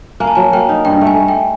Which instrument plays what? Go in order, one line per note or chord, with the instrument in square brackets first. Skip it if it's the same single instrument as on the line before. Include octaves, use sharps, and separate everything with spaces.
[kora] A#3 [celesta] G#5
[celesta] A5
[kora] F#3 [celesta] G#5
[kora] A#3 [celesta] G5
[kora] D#4
[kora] G2 [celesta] G5
[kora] A3
[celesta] G#5
[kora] A3
[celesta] G5